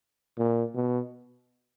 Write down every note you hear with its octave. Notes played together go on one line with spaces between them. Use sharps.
A#2
B2